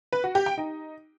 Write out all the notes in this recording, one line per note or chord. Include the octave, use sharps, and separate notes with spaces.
B4
F#4
G4
G5
D#4